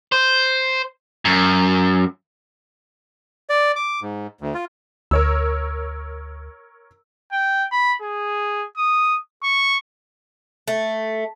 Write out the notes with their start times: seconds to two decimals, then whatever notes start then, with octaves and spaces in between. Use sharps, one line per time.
0.12 C5
1.25 F#2
3.50 D5
3.76 D6
4.02 G#2
4.41 D2
4.54 F4
5.11 D2 A#4 C#5 E6
7.32 G5
7.72 B5
8.02 G#4
8.77 D#6
9.44 C#6
10.68 A3